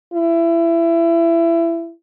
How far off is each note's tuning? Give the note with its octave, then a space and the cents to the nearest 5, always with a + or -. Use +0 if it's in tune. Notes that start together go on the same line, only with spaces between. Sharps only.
E4 +25